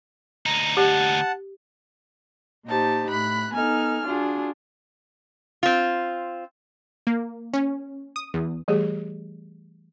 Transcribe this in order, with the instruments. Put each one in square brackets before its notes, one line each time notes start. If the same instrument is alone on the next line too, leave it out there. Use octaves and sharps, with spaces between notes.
[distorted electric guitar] D2 D#4 [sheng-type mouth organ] A#5
[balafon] G4 [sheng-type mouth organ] F#5 A5
[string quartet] A#2 D#4 G4 C5 A5
A2 B5 F#6
B3 D#4 A4 G#5 F6
D4 F4 F#4 G#4
[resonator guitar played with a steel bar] C4 F4
[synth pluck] A#3
C#4
D#6
E2
[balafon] E3 G3 A3 G4 G#4